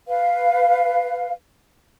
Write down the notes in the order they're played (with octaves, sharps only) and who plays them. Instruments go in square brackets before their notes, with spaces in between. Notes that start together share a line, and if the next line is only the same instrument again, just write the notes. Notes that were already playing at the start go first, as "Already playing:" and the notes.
[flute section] B4 F5